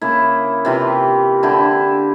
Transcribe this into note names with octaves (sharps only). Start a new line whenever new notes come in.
C#3 A#3 E4
C3 E3 F4
D3 E4 G4